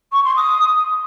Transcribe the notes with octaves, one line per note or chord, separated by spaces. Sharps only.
C#6
C6
D#6